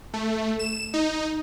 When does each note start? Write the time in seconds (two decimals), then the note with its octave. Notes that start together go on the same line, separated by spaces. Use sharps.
0.14 A3
0.59 E7
0.94 D#4